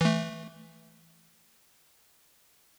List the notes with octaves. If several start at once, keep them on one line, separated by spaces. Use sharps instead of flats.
E3 A3